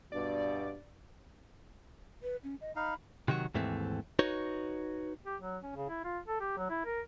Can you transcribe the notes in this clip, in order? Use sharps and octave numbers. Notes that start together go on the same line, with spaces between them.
G2 B2 D5
B4
C#4
D#5
D#4 F5 B5
C3 D#3 F#3 F#4
D#2 G#2 E3 A3 C4
D#4 F#4 B4 C#5
G4
F#3
C#4
C#3
E4
F4
A4
G4
F#3
E4
A#4